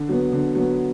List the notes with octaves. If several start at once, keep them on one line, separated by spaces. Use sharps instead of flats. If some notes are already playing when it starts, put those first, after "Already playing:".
Already playing: D3
F#3 B3
D3
F#3 B3